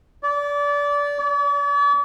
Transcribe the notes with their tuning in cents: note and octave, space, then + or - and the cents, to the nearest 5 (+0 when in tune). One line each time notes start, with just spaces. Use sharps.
D5 -25
D5 -45